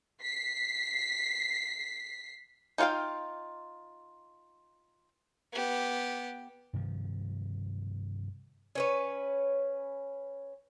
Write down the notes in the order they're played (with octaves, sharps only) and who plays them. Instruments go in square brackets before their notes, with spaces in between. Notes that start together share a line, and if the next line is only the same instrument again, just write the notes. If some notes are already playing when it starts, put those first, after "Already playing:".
[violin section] B6 C7
[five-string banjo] D#4 F4 C#5 F5 G5
[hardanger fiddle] B3 G4
[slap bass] G2 C3 D#3 F3
[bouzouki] C#4 B4 C#5